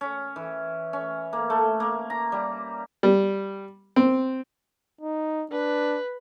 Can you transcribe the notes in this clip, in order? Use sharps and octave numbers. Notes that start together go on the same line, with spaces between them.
C#4
E3
C#4
A#3
A3
A#3
A#5
G3
G3
C4
D#4
D4 B4